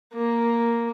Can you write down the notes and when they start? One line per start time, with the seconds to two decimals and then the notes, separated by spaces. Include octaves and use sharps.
0.14 A#3